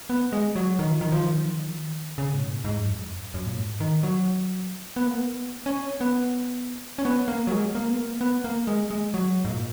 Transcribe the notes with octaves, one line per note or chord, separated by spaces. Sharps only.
B3
G#3
F#3
D#3
F3
D#3
F3
D#3
F3
D#3
F3
D#3
C#3
G#2
A#2
G#2
F#2
F2
G#2
F#2
F#2
A#2
G#2
D#3
F#3
B3
A#3
B3
C#4
B3
C#4
B3
A#3
F#3
G#3
A#3
B3
A#3
B3
A#3
G#3
G#3
F#3
G#2
A#2